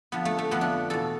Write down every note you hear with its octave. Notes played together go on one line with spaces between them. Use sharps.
F2 D3 F3 B3
A3
A3
F2 D3 F3 B3
D4
E2 B2 A4